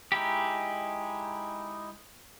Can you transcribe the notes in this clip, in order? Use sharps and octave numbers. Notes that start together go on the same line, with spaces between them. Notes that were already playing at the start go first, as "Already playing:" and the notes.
G#3 D#4 E4 G4